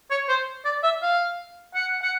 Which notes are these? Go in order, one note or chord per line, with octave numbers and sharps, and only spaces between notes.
C#5
C5
D5
E5
F5
F#5
F#5